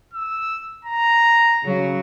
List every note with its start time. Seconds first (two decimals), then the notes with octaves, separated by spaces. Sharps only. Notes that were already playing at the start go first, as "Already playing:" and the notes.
0.13 E6
0.85 A#5
1.65 C#3 F#3